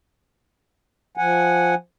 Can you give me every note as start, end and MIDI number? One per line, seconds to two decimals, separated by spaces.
1.17 1.74 53
1.17 1.74 78
1.17 1.74 80